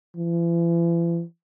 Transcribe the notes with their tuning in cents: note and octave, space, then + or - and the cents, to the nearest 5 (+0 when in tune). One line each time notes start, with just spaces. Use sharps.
E3 +45